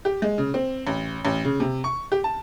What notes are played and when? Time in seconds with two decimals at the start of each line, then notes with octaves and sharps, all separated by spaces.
0.05 G4
0.22 G#3
0.38 C#3
0.54 C4
0.87 A1
1.25 A1
1.45 C#3
1.60 C3
1.84 C#6
2.12 G4
2.24 A5